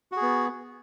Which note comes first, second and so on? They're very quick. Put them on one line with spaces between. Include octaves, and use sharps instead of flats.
F#4 G#4 B3